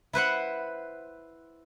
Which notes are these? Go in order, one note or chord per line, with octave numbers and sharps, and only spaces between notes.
E4 B4 C5 F#5